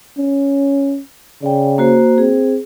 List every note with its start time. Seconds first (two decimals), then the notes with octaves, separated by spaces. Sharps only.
0.18 C#4
1.42 C#3 D5 G5
1.78 A#3 F#4 C5
2.18 C4 G#4